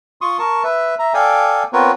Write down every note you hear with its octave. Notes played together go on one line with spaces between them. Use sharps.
F4 C6 C#6 D#6
A#4 A5 C#6
B4 E5
E5 A#5
A4 D5 F5 G5 G#5
B3 C4 F4 A#4 B4 C#5